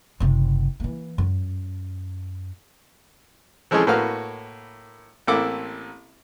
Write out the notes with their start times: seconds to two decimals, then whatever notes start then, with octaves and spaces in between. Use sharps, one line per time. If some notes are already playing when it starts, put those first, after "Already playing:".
0.20 F#1 C3
0.80 E3 A#3
1.18 F#2
3.71 E3 F3 G#3 C#4 G#4 A4
3.87 A2 A#3 F#4 B4 F5 F6
5.27 A1 A#3 C4 E4 A4 D6